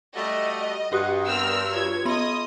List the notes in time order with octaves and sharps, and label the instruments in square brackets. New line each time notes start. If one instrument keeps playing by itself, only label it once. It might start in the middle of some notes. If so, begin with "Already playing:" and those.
[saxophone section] G3 A3 F#4 [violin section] D#5
[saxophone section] G2 [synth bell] F#4 G4 D#6 [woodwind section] F#5
[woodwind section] G3 B3 C4 [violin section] A#4 E6 F6
[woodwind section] F4 C#5 [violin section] G#6
[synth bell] B3 B5 C6 [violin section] D#5 D#6